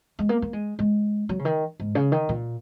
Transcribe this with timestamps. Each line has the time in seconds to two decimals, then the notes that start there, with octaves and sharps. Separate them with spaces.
0.19 G#3
0.29 A#3
0.42 A#3
0.53 G#3
0.79 G#3
1.29 F#3
1.39 C#3
1.45 D#3
1.80 G#2
1.95 C#3
2.12 D#3
2.29 A#2